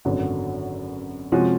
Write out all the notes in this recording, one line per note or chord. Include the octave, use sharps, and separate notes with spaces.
G#1 F#2 D3 F#3 B3
C3 F3 G#3 C#4 F#4